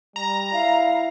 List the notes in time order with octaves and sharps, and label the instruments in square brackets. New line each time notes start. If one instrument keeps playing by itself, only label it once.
[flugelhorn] G3 [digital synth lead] A#5
[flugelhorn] E4 [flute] F5